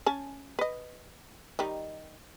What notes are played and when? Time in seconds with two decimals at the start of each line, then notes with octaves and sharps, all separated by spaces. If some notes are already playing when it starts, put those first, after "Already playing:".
0.06 C#4 G#5 A5
0.59 B4 D#5
1.59 D#3 G3 D#4